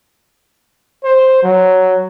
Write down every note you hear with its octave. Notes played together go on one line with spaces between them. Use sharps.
C5
F#3